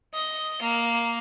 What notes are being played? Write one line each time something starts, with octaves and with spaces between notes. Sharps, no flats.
D#5
A#3